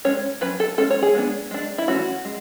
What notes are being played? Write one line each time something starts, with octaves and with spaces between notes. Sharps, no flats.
G#3 C#4 C#5
F#3 C#4 B4
A4
G#3 C#4 A4
C#5
G#4
G#3 B3 D4
G#3 D4
E4
E3 A3 C#4 F#4
G#3